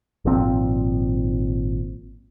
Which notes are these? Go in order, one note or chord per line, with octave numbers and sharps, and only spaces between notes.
G#1 A#2 F3 C4